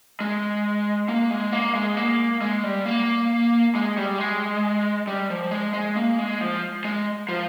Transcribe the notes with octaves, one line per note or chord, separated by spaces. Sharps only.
G#3
A#3
G#3
A#3
G#3
A#3
G#3
G3
A#3
G#3
G3
G#3
G3
F3
G#3
G#3
A#3
G#3
F3
G#3
F3